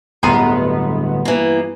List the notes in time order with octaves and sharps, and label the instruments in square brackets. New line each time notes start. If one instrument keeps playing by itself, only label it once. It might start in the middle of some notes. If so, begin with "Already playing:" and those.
[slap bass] D1 D2 [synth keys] G2 B3 [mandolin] A#5 C6 D#6
[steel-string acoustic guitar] E3 A#3